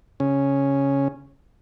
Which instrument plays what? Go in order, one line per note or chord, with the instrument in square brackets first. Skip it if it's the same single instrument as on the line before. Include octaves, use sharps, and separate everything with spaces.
[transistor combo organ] C#3 C#4